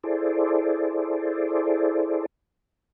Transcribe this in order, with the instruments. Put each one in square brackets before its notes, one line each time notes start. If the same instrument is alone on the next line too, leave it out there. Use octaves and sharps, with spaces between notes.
[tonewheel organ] E4 G#4 A4 C5 D5